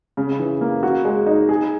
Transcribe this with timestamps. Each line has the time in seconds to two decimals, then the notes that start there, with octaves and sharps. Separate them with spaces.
0.17 C#3
0.39 E3
0.61 A#3
0.83 F#4
1.05 G#3
1.26 D#4
1.49 G#4